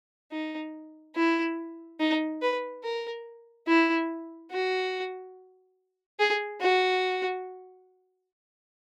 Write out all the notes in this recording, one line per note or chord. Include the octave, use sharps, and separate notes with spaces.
D#4
E4
D#4
B4
A#4
E4
F#4
G#4
F#4